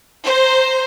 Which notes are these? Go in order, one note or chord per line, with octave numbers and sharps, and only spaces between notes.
C5 A#5